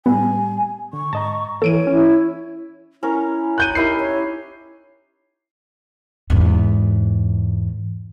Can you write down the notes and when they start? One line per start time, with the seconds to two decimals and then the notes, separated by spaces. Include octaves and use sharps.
0.06 A2 G3 B3 G#5
0.93 D3 C#6
1.13 G#2 D#5 A5 A#5
1.62 E3 A#3 A4 C#5 D7 D#7
1.87 C#4 E4
3.03 C#4 E4 A#4 C#5
3.58 F#6 G6 D#7
3.75 D#4 E4 G4 A#4 C7
4.00 C#5
6.30 E2 G#2